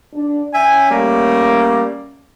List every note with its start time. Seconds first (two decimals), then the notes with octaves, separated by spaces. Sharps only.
0.14 D3 D4
0.54 C#4 E5 G5 G#5
0.90 G3 A3 A#3